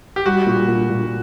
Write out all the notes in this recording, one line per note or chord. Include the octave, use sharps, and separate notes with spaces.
G4
G3 F#4
A#2
A#2
A#2